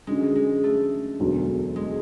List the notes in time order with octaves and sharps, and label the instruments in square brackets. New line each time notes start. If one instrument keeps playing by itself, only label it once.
[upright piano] F#2 D3 F#3 [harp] G#3
[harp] G#3
A3
[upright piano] E1 D2 D3 F#3
[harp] G#3